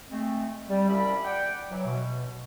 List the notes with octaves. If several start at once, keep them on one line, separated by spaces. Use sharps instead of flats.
G#3 A3 C4
G3
C2 F3 C#4 D5 E5 B5
D5 F#5 G5
E3 F#3
B2